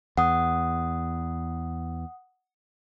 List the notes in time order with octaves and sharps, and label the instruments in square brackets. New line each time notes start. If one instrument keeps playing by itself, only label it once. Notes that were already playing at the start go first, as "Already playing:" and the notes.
[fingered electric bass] E2 [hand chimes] F#5 D#6